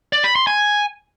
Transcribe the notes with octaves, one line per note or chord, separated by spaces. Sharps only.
D5
B5
C6
G#5